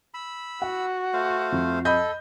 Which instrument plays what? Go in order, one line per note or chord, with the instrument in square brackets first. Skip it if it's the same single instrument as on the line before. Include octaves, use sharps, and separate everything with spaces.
[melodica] B5 E6
[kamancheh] F#4 [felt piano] F#5
[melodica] A3 C5 F5
[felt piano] F2
[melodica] A4 [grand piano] D#5 B5 G6